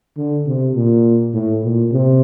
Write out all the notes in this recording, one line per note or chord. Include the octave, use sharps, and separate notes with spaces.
D3
C3
A#2
A2
A#2
C3